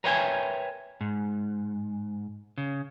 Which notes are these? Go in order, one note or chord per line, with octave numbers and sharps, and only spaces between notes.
A#4 B4 C#5 E5 G5 G#5
G#2
C#3